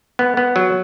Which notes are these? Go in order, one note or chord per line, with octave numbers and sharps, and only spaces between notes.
B3
B3
F#3